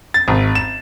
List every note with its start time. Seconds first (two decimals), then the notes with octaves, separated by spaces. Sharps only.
0.14 A6
0.28 G#1
0.55 E7